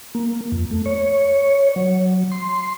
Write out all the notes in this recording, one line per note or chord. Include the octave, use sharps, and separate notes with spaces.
A#3
F2
A3
C#5
F#3
C6